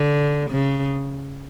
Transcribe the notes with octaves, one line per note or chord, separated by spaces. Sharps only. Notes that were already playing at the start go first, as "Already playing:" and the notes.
Already playing: D3
C#3